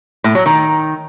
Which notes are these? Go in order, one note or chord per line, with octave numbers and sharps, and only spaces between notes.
A2
F#3
D#3